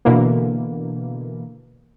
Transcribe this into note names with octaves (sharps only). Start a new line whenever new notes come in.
B2 D3 E3 A#3